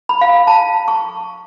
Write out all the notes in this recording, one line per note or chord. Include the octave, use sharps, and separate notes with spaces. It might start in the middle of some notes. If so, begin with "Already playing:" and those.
B5
F5
A5
C#6